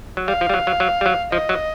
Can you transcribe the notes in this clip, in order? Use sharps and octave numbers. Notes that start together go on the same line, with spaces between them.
F#3
G3 F5
F3
G3
F#3
F#3
F#3
G3
F#3
F3 D#5
F#3